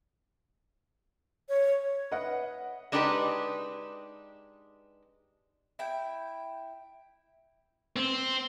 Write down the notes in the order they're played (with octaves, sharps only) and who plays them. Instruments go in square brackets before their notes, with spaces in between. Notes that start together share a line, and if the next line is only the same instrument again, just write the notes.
[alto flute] C#5
[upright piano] B4 D#5 F#5
[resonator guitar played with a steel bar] G#3 D4 D#4 G4 A#4 B4
[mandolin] E4 G5
[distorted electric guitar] C4